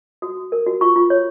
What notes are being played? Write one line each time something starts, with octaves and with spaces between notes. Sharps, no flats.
F#4 D#6
F#4
A#4
F#4
F4 C#6
F4
C#5